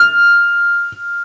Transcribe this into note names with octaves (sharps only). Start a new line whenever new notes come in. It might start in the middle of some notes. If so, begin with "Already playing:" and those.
Already playing: F6